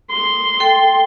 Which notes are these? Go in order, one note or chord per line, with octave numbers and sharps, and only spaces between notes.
C6
A4 G5